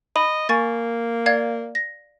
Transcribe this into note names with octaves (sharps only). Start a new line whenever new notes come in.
D#5 B5
A#3 G#5 C#6 A6
D5 F5 G#6
A#6